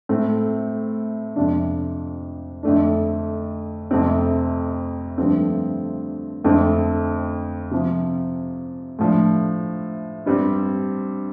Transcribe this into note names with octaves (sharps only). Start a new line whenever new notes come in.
A2 A3 C4
F2 C3 F3 D4
F2 D3 A3 D4
F2 C3 A3 C4
G2 D3 F3 A3 C4
F2 D3 A3 C4
C3 F3 C4
A2 F3 D4
G2 G3 C4